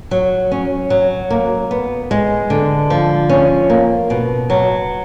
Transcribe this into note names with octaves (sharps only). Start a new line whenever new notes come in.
F#3
C#4
F#3
A#3
B3
G#3
D3
F3
C#4
A#3
B2
F#3